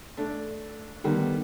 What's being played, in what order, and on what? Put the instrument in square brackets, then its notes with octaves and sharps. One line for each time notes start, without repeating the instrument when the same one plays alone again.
[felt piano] A3 D4
D3 D#3 G3 B3